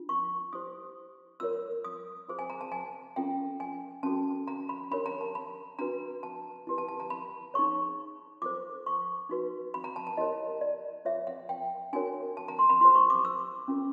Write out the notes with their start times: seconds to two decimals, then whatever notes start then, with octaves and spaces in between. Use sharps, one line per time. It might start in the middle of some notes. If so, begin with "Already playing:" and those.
Already playing: D4 F4
0.09 C#6
0.53 E4 G4 C5 D#6
1.40 F4 A#4 C#5 E6
1.84 D#6
2.28 F4 G#4 C5
2.39 G#5
2.50 A#5
2.61 A5
2.72 G#5
3.16 C#4 F4 A4 G5
3.60 G#5
4.03 C#4 F#4 A4 A5
4.48 A#5
4.69 B5
4.91 D4 G4 A#4 C#5 B5
5.06 A#5
5.21 A5
5.35 B5
5.79 D4 F#4 B4 A#5
6.23 A5
6.67 E4 G4 B4
6.78 A5
6.88 A5
7.00 A#5
7.10 B5
7.54 D#4 G#4 C#5 C#6
8.42 F4 A4 C5 D6
8.86 C#6
9.29 D#4 F#4 B4
9.74 B5
9.84 A#5
9.96 A5
10.07 A5
10.17 E4 G4 A#4 C#5 D#5
10.61 D5
11.05 F4 G#4 C#5 E5
11.27 F#5
11.49 G5
11.93 D4 F#4 A#4 C#5 G#5
12.37 A5
12.48 A#5
12.59 C6
12.69 B5
12.81 E4 G4 C5 C6
12.95 C#6
13.10 D6
13.25 E6
13.68 C#4 F4 A4